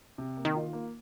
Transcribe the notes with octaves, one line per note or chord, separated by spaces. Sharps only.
C3
A#3
D#3
F4
A#3